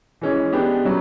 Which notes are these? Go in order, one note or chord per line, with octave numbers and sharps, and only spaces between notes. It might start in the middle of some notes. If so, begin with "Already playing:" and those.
E3 G#3 C#4
G#3 B3 D4 G4
C#3 F#3